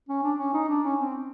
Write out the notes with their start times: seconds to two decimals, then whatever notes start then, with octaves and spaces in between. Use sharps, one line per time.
0.09 C#4
0.24 D4
0.39 C#4
0.54 D#4
0.69 D4
0.84 C#4
0.99 C4